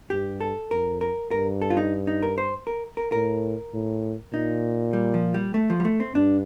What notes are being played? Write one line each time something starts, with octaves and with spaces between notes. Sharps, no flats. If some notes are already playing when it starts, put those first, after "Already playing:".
G2 G4
A4
F2 A#4
A#4
G2 A#4
A4
F4
D#4
D#4
A#4
C5
A#4
A#4
A2 A#4
A2
A#2 D#4
G3
F3
G3
A3
F3
G3
A3
C4
G2 D4